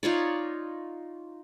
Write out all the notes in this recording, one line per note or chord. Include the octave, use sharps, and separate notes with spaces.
D#4 F4 C#5 D5